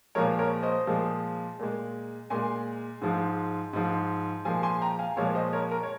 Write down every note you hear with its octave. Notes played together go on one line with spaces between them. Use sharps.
A#2 F3 G#3 A#4 C#5
A#4 C#5
C5 D#5
A#2 F3 G#3
A#2 G#3
A#2 G#3 G#5 C6
G#2 F3 G#3
G#2 F3 G#3
A#2 F3 G#3 G#5 C6
G#5 C6
G5 A#5
F5 G#5
A#2 F3 G#3 C#5 F5
C5 D#5
A#4 C#5
A#4
C#5